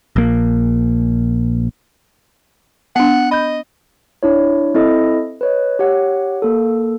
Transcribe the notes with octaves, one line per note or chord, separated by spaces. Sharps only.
A#1 A#3
B3 D4 F#5
D#5 B5 G6
D4 E4 C#5
C4 E4 A4 D#5
B4 C#5 D#5
G4 C#5 F#5
A#3 A4